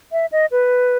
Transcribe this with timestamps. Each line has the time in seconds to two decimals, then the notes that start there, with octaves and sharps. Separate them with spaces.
0.12 E5
0.32 D#5
0.52 B4